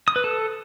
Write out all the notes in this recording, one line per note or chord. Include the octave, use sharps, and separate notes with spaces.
D#6
B4
A4